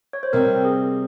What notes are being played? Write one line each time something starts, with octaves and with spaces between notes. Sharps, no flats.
C#5
C5
C3 G3 C4 A#4
G#4